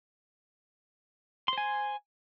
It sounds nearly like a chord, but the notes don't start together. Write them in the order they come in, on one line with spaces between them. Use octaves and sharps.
C6 C5 G#5